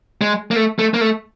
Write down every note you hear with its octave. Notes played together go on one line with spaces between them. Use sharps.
G#3
A#3
A3
A3
A#3
A3